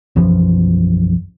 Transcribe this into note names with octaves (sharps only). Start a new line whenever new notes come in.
B1 F#2 E3 F3